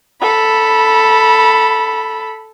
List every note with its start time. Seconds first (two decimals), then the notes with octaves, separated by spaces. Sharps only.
0.22 A4 B5